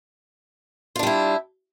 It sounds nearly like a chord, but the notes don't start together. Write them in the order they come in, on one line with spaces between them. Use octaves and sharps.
F4 D4 G3 E4